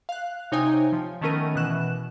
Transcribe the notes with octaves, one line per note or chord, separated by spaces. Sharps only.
F5 F#6
C3 D#4 C#5 G5 G#5 D#6
F3
D#3 A3 B3 C#4 A#4 D#7
B2 E3 F#6 E7